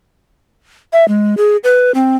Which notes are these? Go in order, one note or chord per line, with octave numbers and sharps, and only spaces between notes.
E5
G#3
G#4
B4
C4